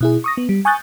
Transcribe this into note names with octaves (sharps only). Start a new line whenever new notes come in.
B2 E4 G#4
C#6 D#6 A#6
B3
G3
G#5 C#6 D#6 F#6 G6 A6